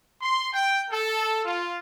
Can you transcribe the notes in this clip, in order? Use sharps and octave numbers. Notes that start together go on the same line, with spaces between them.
C6
G5
A4
F4